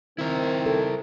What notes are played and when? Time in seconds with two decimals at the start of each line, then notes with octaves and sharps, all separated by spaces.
0.18 D#3 C4 E4 A#4
0.66 A4